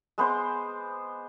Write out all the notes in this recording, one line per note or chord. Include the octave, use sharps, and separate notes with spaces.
G#3 B3 C5 D6